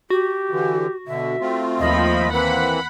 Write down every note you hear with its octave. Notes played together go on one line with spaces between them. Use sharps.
F#4 G4
D3 E3
B2 D3 E5
A3 C4 F4
D#2 F3 D#5 B5
E3 A#3 C4 B4 F#5 B5